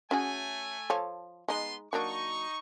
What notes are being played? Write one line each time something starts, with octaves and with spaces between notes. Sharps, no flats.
A3 C#4 F#4 G#4 G#5
F3 A4 C#5
G#3 B3 D#4 C6
F#3 A#3 D4 D#4 C#6